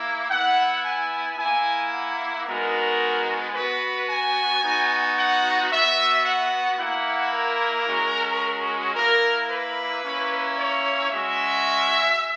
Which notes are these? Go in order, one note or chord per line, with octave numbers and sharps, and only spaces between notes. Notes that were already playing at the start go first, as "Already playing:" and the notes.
Already playing: A#3 E4
B3 E4 F#5
G#5
A#3 E4 G#5
F#5
G#3 B3 D#4 F#4 A#4
B3 F#4 B4
G#5
B3 D#4 F#4
F#5
B3 F#4 E5
F#5
A#3 E4 F#5
A#4
G#3 C#4 F#4
A#3 E4 A#4
B4
A#3 C#4 E4
C#5
G#3 C#4 F#4 E5